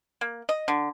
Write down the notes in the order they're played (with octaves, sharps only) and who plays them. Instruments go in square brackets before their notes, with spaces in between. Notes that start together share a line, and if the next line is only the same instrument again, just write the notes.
[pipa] A#3
D#5
D3